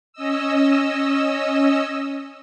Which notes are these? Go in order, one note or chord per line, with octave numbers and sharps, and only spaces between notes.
C#4 D#5 E6